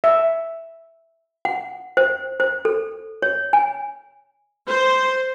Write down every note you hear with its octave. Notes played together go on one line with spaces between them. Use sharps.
E5
F#5
C5
C5
A4
C#5
G#5
C5